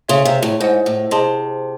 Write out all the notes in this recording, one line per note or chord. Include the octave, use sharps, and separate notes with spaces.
C#3 G#4 C#5 E5 C6
C3
A2
G#2 C5 D#5 F#5
A2
C3 G#4 D#5 A5 C6